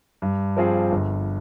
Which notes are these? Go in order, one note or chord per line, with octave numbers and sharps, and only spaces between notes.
G2
F3 C4 F4 G#4
G1